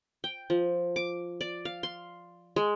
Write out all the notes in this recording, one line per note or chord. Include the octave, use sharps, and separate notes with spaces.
G5
F3
D6
D5
F5
C6
G#3